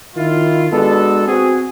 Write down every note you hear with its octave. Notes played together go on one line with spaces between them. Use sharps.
D#3 E4 F4
G#3 B3 D4 F#4 A4
C4 F#4 G#4